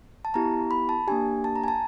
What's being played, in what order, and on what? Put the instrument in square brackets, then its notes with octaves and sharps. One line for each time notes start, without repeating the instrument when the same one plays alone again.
[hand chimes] A5
B3 E4 G4 A#5
B5
A5
A#3 D4 G4 G#5
A5
A#5
G#5
A5